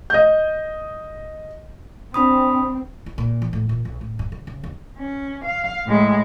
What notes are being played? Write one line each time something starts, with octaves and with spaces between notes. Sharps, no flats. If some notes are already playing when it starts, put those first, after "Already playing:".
D#5 G6
C4 D4 B5 D#6
E4
A#2
E3
A2
A#2
B1
A2
G2
C#3
C#3
D#2
C#4
F5
A2 G#3